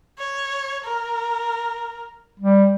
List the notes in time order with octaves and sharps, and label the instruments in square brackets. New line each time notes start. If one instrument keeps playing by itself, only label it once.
[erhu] C#5
A#4
[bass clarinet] G3